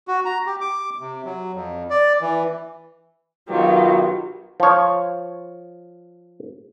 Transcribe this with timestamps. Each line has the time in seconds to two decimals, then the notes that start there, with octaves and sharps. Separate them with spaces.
0.08 F#4
0.25 A#5
0.46 G4
0.61 D6
1.00 C3
1.25 F#3
1.53 F2
1.90 D5
2.21 E3
3.49 B1 D#3 F#3 F4 G4
4.60 F3 C#5